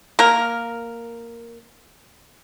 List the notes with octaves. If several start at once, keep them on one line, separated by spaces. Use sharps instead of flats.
A#3 A#4